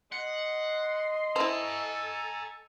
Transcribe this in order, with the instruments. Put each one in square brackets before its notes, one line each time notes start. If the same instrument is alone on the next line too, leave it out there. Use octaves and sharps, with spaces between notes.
[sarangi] D#5 [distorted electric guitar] F#5 [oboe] C6
[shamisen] E4 C5 [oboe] A4 [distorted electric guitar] G#5 A#5